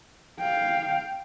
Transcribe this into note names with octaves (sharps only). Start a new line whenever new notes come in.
F5 G5